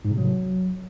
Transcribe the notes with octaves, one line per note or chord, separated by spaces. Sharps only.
G#2
C3
F#3